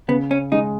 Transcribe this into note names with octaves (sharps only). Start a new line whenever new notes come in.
C#3 B3
C#4
G#3 D#4